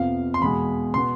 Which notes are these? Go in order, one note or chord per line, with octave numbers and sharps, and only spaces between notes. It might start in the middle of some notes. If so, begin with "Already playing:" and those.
Already playing: F2 C3 F3 B3 F5
C6
E2 B2 G#3 B5
B2 B3 C6